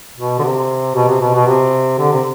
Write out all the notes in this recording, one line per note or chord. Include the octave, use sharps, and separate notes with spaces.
B2
D3
C3
B2
C3
B2
B2
C3
D3
C3